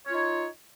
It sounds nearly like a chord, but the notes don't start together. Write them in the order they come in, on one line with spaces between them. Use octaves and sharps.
C#5 F4 D#4